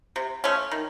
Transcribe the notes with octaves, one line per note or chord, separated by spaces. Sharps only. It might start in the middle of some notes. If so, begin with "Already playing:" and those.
C3
F3 A3 C#4
D#3